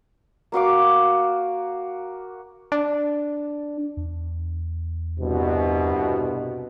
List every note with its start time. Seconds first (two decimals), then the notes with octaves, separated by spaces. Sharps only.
0.52 A#3 F#4 F5 D6
2.72 D4
3.97 E2
5.20 C2 G2 B2